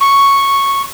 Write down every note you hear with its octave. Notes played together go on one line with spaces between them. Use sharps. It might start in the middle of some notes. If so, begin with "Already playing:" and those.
C#6